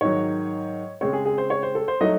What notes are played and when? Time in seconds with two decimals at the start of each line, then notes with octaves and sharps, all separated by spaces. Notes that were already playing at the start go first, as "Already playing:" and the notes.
0.01 G#2 D#3 F#3 C#5
1.01 C#3 G#3 C4 C#5
1.13 G#4
1.25 G#4
1.38 C5
1.50 C#5
1.63 C5
1.75 A4
1.88 C5
2.01 F#3 A3 D#4 D#5